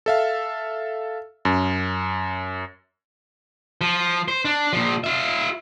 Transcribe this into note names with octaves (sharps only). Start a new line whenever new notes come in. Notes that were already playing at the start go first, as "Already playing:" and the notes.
A4 E5 F5
F#2
F3
C5
D4
A#2 F3
F4 E5